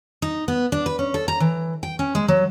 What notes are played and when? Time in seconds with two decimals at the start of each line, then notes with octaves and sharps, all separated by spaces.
0.22 D#4
0.48 B3
0.72 D4
0.86 B4
0.99 C#4
1.14 A4
1.28 A#5
1.40 E3
1.83 G5
1.99 C#4
2.15 G#3
2.28 F#3